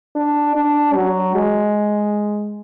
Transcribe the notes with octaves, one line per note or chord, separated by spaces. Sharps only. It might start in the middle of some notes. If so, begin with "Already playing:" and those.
D4
D4
F#3
G#3